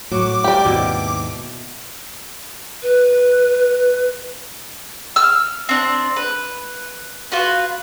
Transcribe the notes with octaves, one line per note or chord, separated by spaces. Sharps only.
A2 F#3 D6
G2 G3 G4 D5
D#2 G#2 B2 C4 E4
B4
E6 F6
C4 D4
B4
F4 F#4 B4